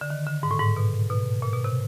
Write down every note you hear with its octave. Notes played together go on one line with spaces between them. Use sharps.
D3
D#3
D3
G#2
A2
G#2
B2
B2
A#2
B2
C3